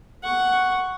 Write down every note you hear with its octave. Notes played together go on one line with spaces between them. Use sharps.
F#5 C#6